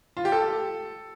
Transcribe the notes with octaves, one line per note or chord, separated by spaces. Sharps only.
F4
G4
A4